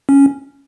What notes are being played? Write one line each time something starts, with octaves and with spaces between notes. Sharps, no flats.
C#4